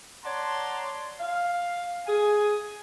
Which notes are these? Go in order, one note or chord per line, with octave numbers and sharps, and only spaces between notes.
C#5 D5 F#5 A5 A#5 C6
F5
G#4 G#5